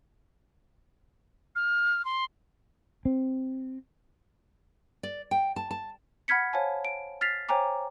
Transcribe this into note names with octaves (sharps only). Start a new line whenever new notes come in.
F6
C6
C4
D5
G5
A5
A5
F#5 B5 F6 G#6 B6 C#7
C5 C#5 F5 G#5 A5
D7
F6 A6 B6 C7 F7
C5 C#5 G5 G#5 A#5 D6